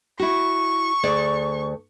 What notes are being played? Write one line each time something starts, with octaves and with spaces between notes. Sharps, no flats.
E4 F#4 C#6
D2 G#4 D5